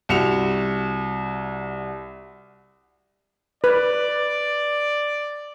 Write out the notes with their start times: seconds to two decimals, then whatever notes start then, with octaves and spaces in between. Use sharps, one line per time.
0.09 C2 F#4 C#7 E7 F7
3.64 B4 D5